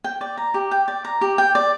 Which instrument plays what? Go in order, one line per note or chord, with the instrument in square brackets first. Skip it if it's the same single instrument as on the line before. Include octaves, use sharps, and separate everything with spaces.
[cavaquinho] G5
D5
A#5
G4
G5
D5
A#5
G4
G5
D5